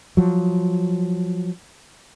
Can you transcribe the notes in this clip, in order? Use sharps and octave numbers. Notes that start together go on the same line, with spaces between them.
F3 F#3